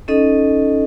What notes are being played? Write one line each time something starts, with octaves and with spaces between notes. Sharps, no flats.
C#4 D#4 A4 D#5